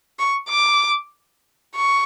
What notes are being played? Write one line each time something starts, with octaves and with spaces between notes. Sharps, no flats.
C#6
D6
C#6